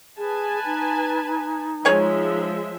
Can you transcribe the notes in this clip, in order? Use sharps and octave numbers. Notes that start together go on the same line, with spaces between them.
G#4 B4 G#5 A5
D#4
F3 G#3 G#4 C#5 E5 G#5